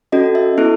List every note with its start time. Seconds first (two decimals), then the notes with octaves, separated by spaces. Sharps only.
0.12 C#4 F#4 A4 D#5
0.35 E5
0.58 B3 E4 A4